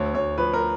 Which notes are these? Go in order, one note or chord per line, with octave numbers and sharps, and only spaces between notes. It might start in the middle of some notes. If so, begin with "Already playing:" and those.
Already playing: D2 C#5
D2 C#5
F3 B4
A#4